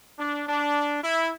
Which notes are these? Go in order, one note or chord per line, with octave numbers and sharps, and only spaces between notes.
D4
D4
E4